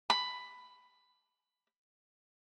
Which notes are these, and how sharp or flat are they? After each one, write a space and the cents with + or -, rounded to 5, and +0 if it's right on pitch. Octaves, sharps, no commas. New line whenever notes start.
B5 +10